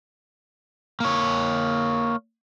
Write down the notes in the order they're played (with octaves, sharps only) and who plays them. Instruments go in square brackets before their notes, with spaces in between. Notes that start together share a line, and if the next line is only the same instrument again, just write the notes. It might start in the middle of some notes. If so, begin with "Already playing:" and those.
[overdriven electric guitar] A#3 C#5